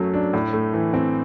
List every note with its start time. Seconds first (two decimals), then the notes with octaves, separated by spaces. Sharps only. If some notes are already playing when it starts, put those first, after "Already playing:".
Already playing: F#2 F#3 A3
0.14 D4
0.33 A2
0.53 A3
0.73 E3
0.94 C4